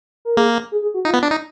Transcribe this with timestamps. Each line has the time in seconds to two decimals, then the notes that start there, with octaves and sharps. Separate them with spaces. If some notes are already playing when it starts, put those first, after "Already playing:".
0.25 A#4
0.37 A#3 G#4
0.72 G#4
0.82 G#4
0.94 F#4
1.05 D#4 F4
1.14 B3
1.23 D4
1.31 D#4